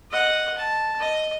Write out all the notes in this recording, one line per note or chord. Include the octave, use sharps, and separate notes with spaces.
D#5 F#5
A5
D#5